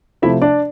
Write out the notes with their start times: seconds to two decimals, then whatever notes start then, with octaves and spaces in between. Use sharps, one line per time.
0.22 C3 F3 A3 E4 E5
0.42 D4 D5